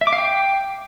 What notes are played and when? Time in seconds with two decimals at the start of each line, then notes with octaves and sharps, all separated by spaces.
0.01 E5
0.07 D6
0.13 F5
0.18 G5